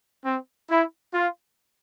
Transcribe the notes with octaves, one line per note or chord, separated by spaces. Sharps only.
C4
E4
F4